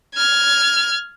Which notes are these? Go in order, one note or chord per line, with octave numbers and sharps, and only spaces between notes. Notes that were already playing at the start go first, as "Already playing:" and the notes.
F6 G#6